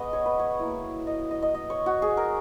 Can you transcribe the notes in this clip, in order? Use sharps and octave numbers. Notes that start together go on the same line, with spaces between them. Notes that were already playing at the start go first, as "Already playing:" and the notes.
Already playing: G#3 B3 F#4 B4 D#5
C#5
B4
C#5
A#3 E4
D#5
D#5
D#5
D#5
C#5
F#4
G#4
A#4